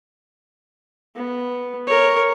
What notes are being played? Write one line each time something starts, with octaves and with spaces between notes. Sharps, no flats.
B3
A#4 C#5